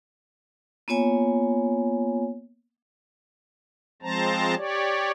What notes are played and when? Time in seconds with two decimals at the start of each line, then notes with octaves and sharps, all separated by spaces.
0.88 A#3 B3 F4 C#5 G#5
4.02 F3 G#3 C4 C5 A5 A#5
4.57 G4 C#5 D5